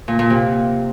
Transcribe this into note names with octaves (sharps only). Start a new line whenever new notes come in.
A#2
A#2
C3